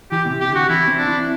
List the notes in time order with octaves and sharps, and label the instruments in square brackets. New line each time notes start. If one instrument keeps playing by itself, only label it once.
[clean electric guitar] E3 [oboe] G4
[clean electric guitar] B2
C3
[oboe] G4
[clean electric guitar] D3
[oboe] F#4
[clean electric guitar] E3 [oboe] E4
[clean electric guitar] C4
[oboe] D4
[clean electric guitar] E4